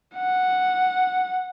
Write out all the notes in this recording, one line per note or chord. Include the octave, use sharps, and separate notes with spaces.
F#5